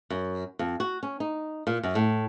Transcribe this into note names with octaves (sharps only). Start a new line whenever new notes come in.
F#2
F2
F#4
C#4
D#4
A#2
F#2
A2